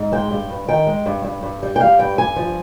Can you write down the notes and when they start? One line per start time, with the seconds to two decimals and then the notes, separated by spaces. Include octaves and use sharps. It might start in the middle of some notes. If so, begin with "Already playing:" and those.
Already playing: G#2
0.12 G#3 G5
0.31 G2
0.50 G2
0.68 D#3 G5
0.87 G#3
1.06 G2
1.24 G2
1.43 G2
1.63 G3
1.76 G5
1.81 G3 F5
1.99 G2 G5
2.18 G2 G#5
2.36 F3